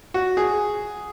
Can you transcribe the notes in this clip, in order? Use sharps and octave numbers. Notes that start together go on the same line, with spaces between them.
F#4
G#4